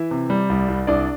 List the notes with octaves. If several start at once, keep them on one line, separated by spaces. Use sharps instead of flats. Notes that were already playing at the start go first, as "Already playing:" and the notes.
Already playing: E3 E4 E5
C3
G3
C2
C2
C2 D4 D5